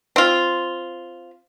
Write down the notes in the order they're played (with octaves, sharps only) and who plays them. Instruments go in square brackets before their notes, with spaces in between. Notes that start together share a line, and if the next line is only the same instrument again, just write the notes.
[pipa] C4 F4